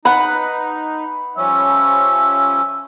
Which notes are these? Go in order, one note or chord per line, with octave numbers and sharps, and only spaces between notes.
D#4 B4 F#5 B5
F3 G3 C#4 E5